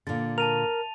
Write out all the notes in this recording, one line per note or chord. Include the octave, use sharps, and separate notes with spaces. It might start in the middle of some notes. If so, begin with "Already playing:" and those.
A#2 D3 A6
A#4 A5 D#7 F7